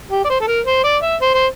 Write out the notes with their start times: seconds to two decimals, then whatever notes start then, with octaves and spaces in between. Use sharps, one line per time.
0.11 G4
0.25 D5
0.29 C5
0.41 A4
0.48 A#4
0.66 C5
0.84 D5
1.03 E5
1.21 C5
1.34 C5